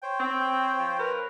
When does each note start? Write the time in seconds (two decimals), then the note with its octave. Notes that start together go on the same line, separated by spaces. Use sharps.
0.03 C5 C#5 G5
0.19 C4
0.79 F3
0.99 A#4 B4